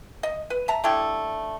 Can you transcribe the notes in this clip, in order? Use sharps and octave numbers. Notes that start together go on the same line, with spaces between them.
D#5
B4
E5 A5 A#5
D3 A3 E4 G4